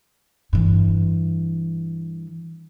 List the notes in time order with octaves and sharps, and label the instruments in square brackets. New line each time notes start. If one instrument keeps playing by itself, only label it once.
[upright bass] G2 E3